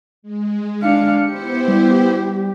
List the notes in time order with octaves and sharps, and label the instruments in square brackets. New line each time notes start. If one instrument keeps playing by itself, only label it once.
[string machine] G#3
[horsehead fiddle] D4 F5 [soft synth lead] C#7
[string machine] B3 E4 C5 [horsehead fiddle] G4
[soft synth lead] G3